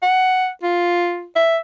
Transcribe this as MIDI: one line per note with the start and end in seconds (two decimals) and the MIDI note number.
0.03 0.49 78
0.63 1.26 65
1.36 1.58 76